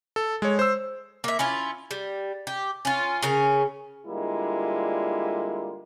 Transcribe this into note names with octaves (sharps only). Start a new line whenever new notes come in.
A4
G#3 C#5
C5 E6
A#3 E5
C#4 E4 F4
G3
G4
C#4 F4
C#3 C#4 A#4
D3 G3 G#3 A#3 E4 F4